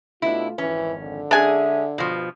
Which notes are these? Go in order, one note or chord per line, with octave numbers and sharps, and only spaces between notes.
B2 A3 D4 E4 F4
G#1 F2 E3 C#4
D3
G#3 C#4 D4 G#4 E5 G#5
G2 B2 F3